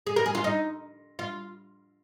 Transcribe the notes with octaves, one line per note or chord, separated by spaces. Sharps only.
G#4
A#4
G#4
F4
D#4
F4